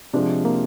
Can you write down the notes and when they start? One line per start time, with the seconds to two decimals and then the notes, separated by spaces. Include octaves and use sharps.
0.13 C3 F3 G#3 D4
0.45 A#3